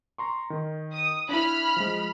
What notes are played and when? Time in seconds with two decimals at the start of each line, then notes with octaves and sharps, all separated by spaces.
0.18 A#5 C6 C#6
0.50 D#3
0.92 D#6
1.29 D4 E4 B5 F6
1.76 F3 G#3